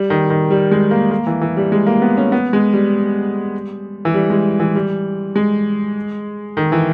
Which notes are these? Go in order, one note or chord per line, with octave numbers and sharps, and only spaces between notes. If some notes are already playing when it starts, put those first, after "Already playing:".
Already playing: G3
D#3
D#3
G3
G#3
A#3
A#3
E3
E3
G3
G#3
A#3
B3
C#4
B3
G#3
G3
E3
G3
G#3
E3
G3
G#3
D#3
E3